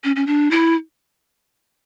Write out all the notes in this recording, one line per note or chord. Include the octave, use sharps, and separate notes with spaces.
C#4
C#4
D4
E4